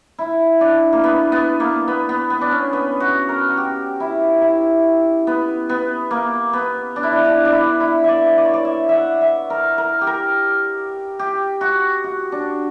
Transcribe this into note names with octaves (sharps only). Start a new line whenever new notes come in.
E4
D4
A#3
B3
B3
A#3
B3
B3
B3
D4
C#4
B3
F#4
A#4
F#4
G4
E4
E4
B3
B3
A#3
B3
D4
E4
D4
D4
D4
E4
E4
D5 E5
D5
C#5
D5
E5
E5 F#5
E5
A#4
A#4
G4
A#4
G4
F#4
F#4
D4